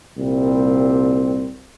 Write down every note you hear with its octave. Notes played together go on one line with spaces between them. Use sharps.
C2 A#2 G3 C4